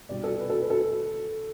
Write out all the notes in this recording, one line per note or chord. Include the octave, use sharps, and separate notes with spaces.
C2 B2 G3 D5
A4
B4
A4
B4
A4